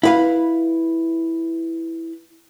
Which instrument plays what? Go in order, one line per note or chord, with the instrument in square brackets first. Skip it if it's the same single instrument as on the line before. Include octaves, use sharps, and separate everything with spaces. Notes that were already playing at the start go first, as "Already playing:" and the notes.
[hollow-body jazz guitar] E4 B4 F5